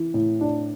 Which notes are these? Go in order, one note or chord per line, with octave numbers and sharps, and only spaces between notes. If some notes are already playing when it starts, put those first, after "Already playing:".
Already playing: E3
A2
D4